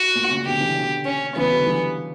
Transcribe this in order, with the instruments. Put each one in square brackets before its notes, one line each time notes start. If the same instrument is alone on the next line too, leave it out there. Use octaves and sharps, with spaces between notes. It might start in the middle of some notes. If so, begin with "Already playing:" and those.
Already playing: [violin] F#4
[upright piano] A#2
A#2 C#3
[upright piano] B2 D3 [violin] G4
[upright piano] C#3 E3
B2 D3
[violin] C#4
[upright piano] C#3 E3 [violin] B3
[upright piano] D3 F#3
E3 G3